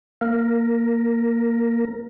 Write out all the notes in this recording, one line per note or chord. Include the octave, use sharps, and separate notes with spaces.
A#3 A#4